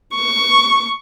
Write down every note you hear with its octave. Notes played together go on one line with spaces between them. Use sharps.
C#6